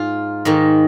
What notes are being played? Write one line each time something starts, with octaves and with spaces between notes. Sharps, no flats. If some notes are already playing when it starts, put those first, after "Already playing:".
Already playing: G#2 F4
G#2 D#3